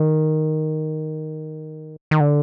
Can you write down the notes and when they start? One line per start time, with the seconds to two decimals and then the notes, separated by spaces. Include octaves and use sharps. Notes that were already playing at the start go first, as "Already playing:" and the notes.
Already playing: D#3
2.11 D#3
2.20 D3